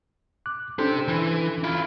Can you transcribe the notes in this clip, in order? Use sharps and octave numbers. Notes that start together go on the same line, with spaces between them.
D6 F#6
C#4 D4 G4 A4 C5
E3
E4 F4